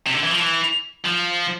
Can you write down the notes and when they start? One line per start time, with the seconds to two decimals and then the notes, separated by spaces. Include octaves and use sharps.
0.06 C3
0.15 D3
0.24 E3
0.31 F3
0.39 E3
1.06 F3